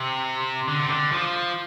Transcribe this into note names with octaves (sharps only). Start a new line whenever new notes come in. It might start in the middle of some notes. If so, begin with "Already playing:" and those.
Already playing: C3
D3
C3
D3
F3